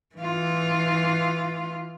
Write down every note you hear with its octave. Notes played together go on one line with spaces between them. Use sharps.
E3 F4